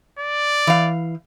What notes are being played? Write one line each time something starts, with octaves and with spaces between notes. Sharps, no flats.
D5
E3 F5